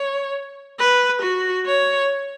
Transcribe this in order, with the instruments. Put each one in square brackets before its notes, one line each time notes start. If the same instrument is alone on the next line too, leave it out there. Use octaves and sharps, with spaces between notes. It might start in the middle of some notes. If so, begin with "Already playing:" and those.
Already playing: [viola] C#5
B4
F#4
C#5